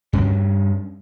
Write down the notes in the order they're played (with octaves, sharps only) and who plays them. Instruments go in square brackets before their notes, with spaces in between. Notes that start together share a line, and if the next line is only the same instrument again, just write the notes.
[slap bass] G2 C#4